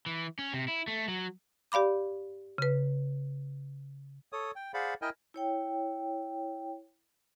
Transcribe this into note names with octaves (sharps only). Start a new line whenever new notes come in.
E3
C#4
C3
E4
A3
F#3
G4 D5 F5 B5 D6
C#3 B4
A4 C#5 D#6
G5
G#4 C5 D5 F5 F#5 B5
E4 A#4 D#5 G5 G#5
E4 C#5 G5